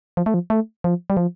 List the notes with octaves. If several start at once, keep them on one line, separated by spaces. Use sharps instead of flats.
F3
A3
F3
A3
F3
G3
F3